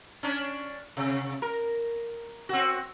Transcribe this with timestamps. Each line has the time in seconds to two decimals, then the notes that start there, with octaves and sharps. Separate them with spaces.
0.23 C#4 D4
0.97 C3
1.42 A#4
2.49 C4 F#4